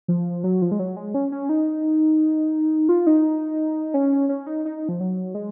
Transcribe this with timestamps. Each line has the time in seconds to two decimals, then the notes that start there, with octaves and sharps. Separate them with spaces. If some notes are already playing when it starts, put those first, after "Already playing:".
0.08 F3
0.44 F#3
0.62 F3
0.72 G#3
0.79 F#3
0.97 G#3
1.14 C#4
1.32 C#4
1.49 D#4
2.89 F4
3.07 D#4
3.94 C#4
4.29 C#4
4.47 D#4
4.65 D#4
4.77 D#4
4.89 F3
5.00 F#3
5.35 G#3